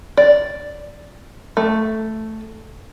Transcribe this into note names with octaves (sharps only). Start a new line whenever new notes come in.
D5
A3